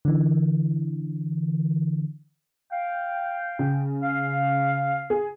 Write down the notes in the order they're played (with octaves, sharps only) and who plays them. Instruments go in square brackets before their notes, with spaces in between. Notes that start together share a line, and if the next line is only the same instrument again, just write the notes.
[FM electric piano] D3 E3
[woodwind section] F5 G5
[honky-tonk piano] C#3
[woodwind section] F5
[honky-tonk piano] G#4